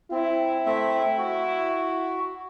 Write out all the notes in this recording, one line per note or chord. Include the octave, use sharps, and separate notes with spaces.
C4 E4
A3 C4 E5
F#4